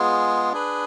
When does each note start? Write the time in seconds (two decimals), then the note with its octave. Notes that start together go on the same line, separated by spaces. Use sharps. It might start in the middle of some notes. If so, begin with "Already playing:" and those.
Already playing: G#3 B3 F4 G#4
0.52 D4 G#4 B4